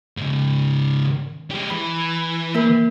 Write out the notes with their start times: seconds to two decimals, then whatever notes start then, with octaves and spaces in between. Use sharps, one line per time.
0.17 G#2 C#3
1.51 G#3 G4
1.70 E3 B5
2.55 A#3 A#4